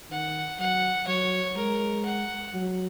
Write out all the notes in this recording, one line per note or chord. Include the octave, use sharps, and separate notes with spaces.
D#3 F#5
F#3 F#5
F#3 C#5
G#3 A#4
F#5
F#3